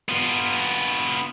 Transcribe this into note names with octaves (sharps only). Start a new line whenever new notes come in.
B3 F4